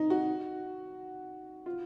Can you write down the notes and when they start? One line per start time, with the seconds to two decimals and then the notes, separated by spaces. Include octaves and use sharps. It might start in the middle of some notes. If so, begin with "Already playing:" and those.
Already playing: D#4
0.10 F#4
1.66 F4